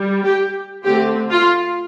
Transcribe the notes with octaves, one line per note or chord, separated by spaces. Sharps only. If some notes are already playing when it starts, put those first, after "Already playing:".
Already playing: G3
G4
D3 A3 C4 G4
F4